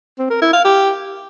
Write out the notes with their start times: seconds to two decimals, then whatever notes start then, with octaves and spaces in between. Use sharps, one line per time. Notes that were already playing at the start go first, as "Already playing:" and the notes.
0.18 C4
0.30 A#4
0.41 E4
0.53 F5
0.64 G4